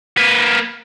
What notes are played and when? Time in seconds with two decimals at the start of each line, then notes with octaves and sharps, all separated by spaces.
0.18 A#3 B4